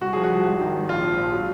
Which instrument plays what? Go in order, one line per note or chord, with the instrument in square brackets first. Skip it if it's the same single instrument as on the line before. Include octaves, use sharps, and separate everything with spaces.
[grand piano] C2 F#4
F3 G#4
F#4
C2
G#1
D#3
G#1
A#1 F4
F3
A#1
F#3